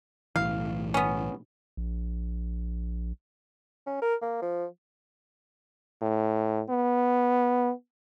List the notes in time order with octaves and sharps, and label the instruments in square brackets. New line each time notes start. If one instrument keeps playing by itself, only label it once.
[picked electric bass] B1 A2 E3 [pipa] F5
[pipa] B3 C#4
[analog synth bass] A#1
[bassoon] C#4
A#4
A#3
F3
[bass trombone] A2
B3